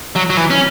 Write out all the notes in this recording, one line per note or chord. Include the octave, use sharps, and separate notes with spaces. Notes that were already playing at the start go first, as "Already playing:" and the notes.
F#3
F#3
E3
C#4